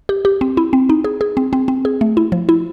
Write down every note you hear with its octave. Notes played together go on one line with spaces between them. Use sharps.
G4
G4
C4
E4
C4
D#4
G#4
G#4
C4
C4
C4
G#4
A3
E4
F3
E4